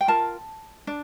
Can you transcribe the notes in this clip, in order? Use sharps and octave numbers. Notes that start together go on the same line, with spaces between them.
G5
F4 A#4 A5
D4